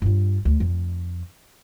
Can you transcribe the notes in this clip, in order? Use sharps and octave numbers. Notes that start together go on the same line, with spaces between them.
G2 F4
D2
F2